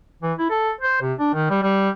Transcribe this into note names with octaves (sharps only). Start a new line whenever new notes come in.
E3
E4
A4
C5
C3
D4
D#3
G3
G3